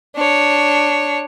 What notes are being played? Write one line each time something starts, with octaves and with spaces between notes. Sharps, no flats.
D4 C#5